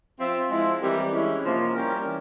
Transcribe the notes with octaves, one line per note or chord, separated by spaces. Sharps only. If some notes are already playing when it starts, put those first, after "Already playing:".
F3 C4 F4 C5 E5
F3 G#3 E4
E3 G3 C4 G4 A#4
G#3 C#4 E4
C3 F3 A#3 C#4
G3 C#4 G4 A#4
E3